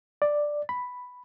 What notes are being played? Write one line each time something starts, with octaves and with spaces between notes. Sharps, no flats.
D5
B5